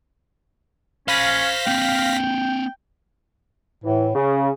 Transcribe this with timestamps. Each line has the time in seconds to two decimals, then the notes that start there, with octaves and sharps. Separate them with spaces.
1.08 C#4 C5 F5 B5 A#6 B6
1.67 A#3 C4 G5
3.84 A2 E3
4.15 C#3 G#4